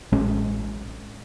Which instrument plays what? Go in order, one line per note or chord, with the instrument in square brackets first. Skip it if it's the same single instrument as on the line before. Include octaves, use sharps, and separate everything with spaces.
[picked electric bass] A1 G#3 C#4